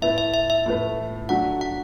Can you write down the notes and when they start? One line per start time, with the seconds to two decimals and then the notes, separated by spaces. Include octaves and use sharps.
0.02 A2 A3 E4 B4 E5
0.18 E5
0.34 E5
0.50 E5
0.66 A2 A3 E4 B4
1.29 F#3 A3 D4 F#4 F#5
1.61 F#5